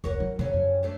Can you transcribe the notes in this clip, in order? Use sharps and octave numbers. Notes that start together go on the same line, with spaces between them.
F1 C#2 F#4 A#4 C#5
F#3
F2 C#3 F#3 C#4
F#2
G2 A3 D4